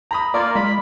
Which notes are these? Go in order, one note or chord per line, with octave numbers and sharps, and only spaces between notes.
A#5 B5 D#6
A#3 F4 A#4 D5
G#3 B5